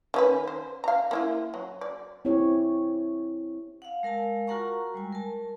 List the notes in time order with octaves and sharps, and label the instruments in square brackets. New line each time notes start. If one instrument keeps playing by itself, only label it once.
[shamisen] D#3 C#4 B4
C5
F5 A#5
A#3 E4 F4
F#3
D5
[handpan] C4 E4 G4 C#5
[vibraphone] F5 F#5
G#3 A#4 F5 A5
F4 F#4 A#4 F#5 A#5 C#6
G3 G#3 G#5
A#4 A5